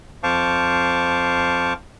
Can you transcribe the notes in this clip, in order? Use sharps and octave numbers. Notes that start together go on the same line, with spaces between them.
F2 C5 F5 A5 C#6 D6